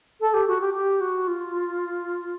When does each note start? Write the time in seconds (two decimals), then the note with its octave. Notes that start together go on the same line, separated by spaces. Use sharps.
0.21 A4
0.34 G4
0.47 F#4
0.60 G4
0.74 G4
1.00 F#4
1.27 F4